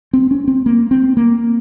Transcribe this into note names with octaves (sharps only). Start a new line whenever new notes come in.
C4
C#4
C4
A#3
C4
A#3